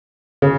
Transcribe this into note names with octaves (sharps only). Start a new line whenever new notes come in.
C#3